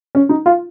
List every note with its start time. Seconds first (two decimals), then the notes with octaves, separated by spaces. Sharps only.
0.15 C#4
0.29 D#4
0.46 F4